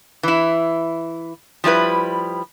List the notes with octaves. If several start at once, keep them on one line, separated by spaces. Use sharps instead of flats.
E3 E4
F3 G3 E4 B4